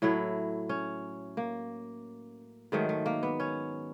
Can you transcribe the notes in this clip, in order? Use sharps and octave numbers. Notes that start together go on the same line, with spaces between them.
A2 F#3 A3 E4
C#4
A#3
G#2 D#3 F#3 A3
A3
A#3
B3
C#4